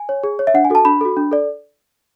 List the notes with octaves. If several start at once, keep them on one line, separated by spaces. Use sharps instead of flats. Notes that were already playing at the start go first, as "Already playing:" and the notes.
Already playing: G#5
C#5
G#4
C#5
E5
D4 F#5
G#5
F#4 A4 A5
D4 B5
F#4 A4
D4
A4 D5